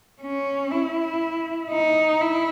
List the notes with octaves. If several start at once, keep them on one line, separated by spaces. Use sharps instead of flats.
C#4
E4
D#4
E4